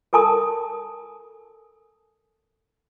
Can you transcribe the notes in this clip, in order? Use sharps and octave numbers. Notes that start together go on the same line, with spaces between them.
A4 A#4 G#5 A5 D#6